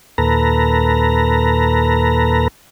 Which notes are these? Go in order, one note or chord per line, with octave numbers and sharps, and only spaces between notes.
D#2 A#2 A4 B4 A#5